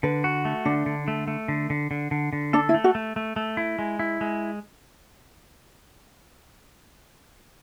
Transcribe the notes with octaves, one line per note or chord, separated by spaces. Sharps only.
D3 B4
F#4
A3
D3 D4
D3
A3
A3
D3
D3
D3
D3
D3
D4 A4
E4
A3
F#4
A3
A3
A3
E4
G#3
E4
G#3